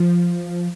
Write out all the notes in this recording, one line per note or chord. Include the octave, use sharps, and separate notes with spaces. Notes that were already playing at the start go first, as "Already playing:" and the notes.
Already playing: F3